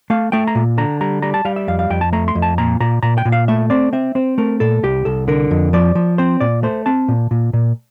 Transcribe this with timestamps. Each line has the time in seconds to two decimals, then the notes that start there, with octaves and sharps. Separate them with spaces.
0.10 A3 F5
0.32 A3 G5
0.47 A#5
0.55 A#2
0.78 D3 A#5
1.01 G3 A#5
1.22 G3 A#5
1.34 A5
1.45 G3 F5
1.56 E5
1.68 F2 F5
1.79 F5
1.90 F2 G5
2.01 A5
2.13 A3 A#5
2.28 C6
2.35 F2
2.42 A5
2.58 A#2 A#5
2.80 A#2 A#5
3.03 A#2 A#5
3.18 G5
3.25 A#2
3.32 F5
3.48 A3 E5
3.70 C4 D5
3.93 C4 E5
4.15 C4 C5
4.38 A3 A#4
4.60 A#2 A4
4.83 C2 G4
5.05 C2 A4
5.28 D3 A#4
5.51 F2
5.73 F3 D5
5.95 F3
6.18 C4 C5
6.40 A#2 D5
6.63 A3 C5
6.86 C4 A5
7.08 A#2
7.31 A#2
7.53 A#2